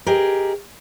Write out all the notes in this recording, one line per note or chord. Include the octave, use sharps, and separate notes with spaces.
G4 G#4 A#4 D#5